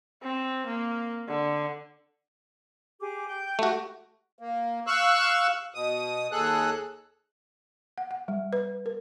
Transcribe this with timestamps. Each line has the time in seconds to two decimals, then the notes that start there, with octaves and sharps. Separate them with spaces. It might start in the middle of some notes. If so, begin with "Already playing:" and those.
0.23 C4
0.67 A#3
1.28 D3
3.00 G4 G#4 D6
3.28 G5 G6
3.59 A3 F#4 G4
4.39 A#3
4.87 F5 C#6 E6 F#6
5.74 B2 D#6
6.32 D#2 G#4 A4 F#6
7.98 F#5
8.11 F#5
8.28 G3
8.53 B4
8.86 A#4